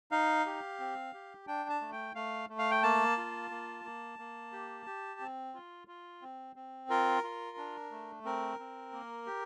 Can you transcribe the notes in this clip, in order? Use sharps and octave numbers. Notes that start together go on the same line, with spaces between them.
D#4 F5
G4
C4
G4
D4 G5
A5
A3
G5
A3 F5
A3
F5
G5
A#3 A5
F4
A#3
A#3
A#3
G4
G4
C4
F4
F4
C4
C4
F4 A#4
F4
D4
A3
C4 A#4
C4
A#3
G4